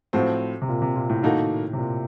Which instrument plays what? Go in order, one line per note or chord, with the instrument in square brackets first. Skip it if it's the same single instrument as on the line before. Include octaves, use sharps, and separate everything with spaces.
[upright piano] A2 F3 C4 F#4
[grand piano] C3
A#2
C3
A#2
A2
[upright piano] D#3 A#3 D#4 F#4 A4
[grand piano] C3
A#2